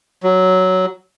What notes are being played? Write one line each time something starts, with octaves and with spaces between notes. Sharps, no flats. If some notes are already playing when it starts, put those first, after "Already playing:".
F#3